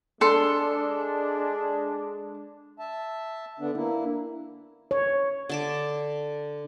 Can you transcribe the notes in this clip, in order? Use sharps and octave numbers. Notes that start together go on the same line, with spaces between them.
G#3 D4 A4 C6
E5 A5
D3 B3 D4
A#3 D4 E4
C#5
D3 A5 D6